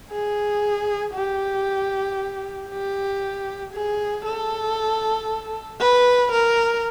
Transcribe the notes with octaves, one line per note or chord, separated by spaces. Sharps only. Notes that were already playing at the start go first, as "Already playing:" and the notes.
G#4
G4
G4
G#4
A4
B4
A#4